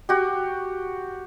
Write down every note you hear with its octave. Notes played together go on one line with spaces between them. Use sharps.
F#4 G4